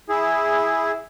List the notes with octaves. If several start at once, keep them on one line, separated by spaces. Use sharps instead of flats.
E4 G#4